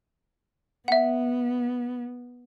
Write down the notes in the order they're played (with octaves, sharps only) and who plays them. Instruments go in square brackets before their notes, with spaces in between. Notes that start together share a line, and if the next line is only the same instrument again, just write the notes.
[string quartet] B3 [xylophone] E5 F#5